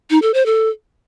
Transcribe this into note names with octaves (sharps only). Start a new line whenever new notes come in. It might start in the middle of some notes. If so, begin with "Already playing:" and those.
D#4
A4
C5
A4